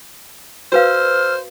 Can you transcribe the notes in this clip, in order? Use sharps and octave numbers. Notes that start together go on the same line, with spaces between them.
F#4 B4 C5 F5 E6 F6